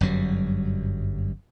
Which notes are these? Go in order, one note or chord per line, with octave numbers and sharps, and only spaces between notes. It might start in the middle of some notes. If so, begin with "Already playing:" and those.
G1 F#2 F#3 G3